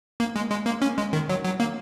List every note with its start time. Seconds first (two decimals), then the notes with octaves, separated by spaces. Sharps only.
0.20 A#3
0.36 G#3
0.51 G#3
0.66 A#3
0.82 C#4
0.98 G#3
1.13 D#3
1.29 F#3
1.45 F#3
1.60 A#3